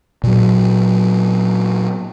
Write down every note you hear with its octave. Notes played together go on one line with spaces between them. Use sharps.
A#2 F#3